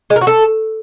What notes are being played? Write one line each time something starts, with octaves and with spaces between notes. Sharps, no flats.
G#3
A#4
F#4
A4